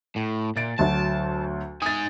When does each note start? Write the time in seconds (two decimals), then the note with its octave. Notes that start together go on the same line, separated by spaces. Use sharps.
0.16 A2
0.57 A#2 A6 D7
0.79 D2 F#3 A5
1.82 D#4 G#5 D#6 A6